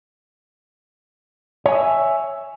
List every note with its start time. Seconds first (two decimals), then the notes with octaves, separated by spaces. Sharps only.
1.66 C#5
1.69 G#5
1.72 D#5
1.75 E5